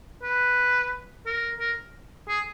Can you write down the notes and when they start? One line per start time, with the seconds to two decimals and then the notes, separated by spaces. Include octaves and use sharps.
0.22 B4
1.26 A#4
1.59 A#4
2.28 G#4